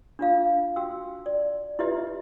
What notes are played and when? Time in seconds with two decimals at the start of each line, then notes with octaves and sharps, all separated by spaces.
0.19 D4 F4 F5
0.76 F#4 G5 E6
1.26 D5
1.79 E4 F4 G4 B4 D#5 E5